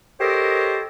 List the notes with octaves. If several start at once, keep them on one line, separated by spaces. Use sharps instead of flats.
G4 A4 A#4 C5 C#5 D#5